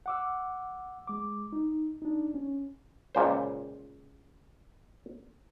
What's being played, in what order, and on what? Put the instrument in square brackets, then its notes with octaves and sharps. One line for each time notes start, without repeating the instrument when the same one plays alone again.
[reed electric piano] F#5 D6 E6
G#3 D6
D#4
D4 D#4
C#4
[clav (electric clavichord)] C#2 A#2 C5